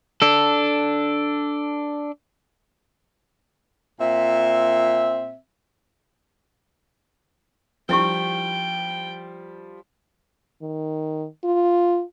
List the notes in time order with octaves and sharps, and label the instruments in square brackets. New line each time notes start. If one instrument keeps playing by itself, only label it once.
[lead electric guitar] D4 A4
[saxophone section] A#2 C4 E5
[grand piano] F3 G3 [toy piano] D4 E4 C#6 [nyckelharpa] G5
[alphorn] D#3
F4